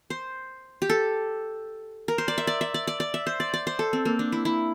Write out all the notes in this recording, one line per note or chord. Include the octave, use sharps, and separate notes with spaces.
C5
G4
A4
A#4
C5
D5
E5
D5
E5
D5
D5
D5
E5
C5
D5
D5
C5
A4
C4
A#3
D4
E4
E4